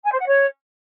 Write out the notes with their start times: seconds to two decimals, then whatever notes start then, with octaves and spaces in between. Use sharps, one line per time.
0.04 G#5
0.12 C5
0.19 F#5
0.27 C#5